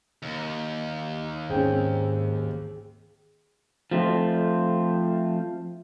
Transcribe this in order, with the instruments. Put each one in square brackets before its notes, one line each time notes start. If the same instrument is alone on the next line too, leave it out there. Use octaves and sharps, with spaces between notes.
[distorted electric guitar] D#2
[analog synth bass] G#2 [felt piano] C4 C#4 [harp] G#4 G5
[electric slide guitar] F3 A3 C4